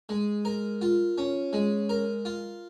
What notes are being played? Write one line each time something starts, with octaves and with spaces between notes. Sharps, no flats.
G#3
A#4
F4
C#4
G#3
A#4
F4